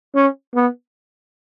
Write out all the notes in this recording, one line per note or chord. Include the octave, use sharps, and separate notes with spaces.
C#4
B3